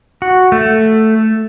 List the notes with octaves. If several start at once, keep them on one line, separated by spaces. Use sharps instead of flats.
F#4
A3